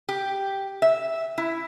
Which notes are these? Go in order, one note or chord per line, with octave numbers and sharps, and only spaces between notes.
G4
E5
E4